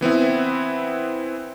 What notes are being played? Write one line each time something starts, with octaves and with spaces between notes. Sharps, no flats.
E3 B3 C4 E4